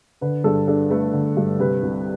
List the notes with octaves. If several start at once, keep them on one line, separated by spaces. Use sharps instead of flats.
D3 B4
G2 A4
D4 A4
A3 B4
D3
G2
C3 B4
C2